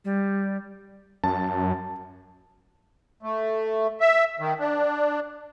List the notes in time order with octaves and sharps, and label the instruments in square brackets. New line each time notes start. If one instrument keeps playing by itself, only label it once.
[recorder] G3
[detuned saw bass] F#2 [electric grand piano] A5
[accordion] A3
E5
D#3
D4